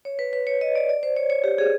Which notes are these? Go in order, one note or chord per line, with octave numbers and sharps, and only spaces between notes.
C#5
B4
B4
C#5
D#5
D5
D5
C5
C#5
C#5
G4
G#4